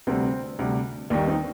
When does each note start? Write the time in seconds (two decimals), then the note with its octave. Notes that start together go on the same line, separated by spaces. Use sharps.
0.07 D2 C3 G3 C4
0.59 D2 C3 G3
1.10 D#2 D#3 G3 A#3 D4
1.28 C4 D#4